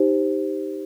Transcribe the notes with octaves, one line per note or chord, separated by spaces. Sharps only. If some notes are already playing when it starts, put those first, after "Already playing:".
Already playing: D#4 G4 C5